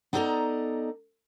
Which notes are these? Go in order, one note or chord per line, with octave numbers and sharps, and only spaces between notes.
B3 D#4 A4 D5 D#5 A#5